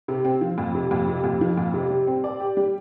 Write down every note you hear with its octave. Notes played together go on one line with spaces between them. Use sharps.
C3
C4
F3
F2
C3
F2
C3
F2
F3
F2
C3
G3
C4
D5
G4
G3